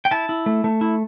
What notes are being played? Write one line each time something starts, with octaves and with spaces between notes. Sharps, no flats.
G5
E4 A5
E4
A3
A3
E4